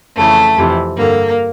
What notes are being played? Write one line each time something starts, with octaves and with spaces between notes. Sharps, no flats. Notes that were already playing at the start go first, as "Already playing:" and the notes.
F2 C#3 E3 A3
F2 C3 E3
G2 D3 A#3